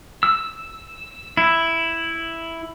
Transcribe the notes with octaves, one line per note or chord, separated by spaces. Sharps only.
E6
E4